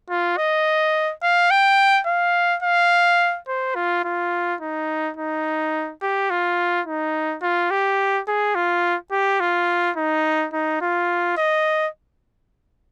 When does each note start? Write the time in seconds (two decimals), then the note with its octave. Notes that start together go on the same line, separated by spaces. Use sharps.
0.10 F4
0.37 D#5
1.22 F5
1.51 G5
2.07 F5
2.63 F5
3.48 C5
3.75 F4
4.05 F4
4.61 D#4
5.17 D#4
6.02 G4
6.30 F4
6.86 D#4
7.42 F4
7.71 G4
8.28 G#4
8.55 F4
9.12 G4
9.40 F4
9.97 D#4
10.53 D#4
10.81 F4
11.37 D#5